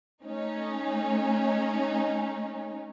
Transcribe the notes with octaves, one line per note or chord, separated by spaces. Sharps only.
A3 C#4 D#4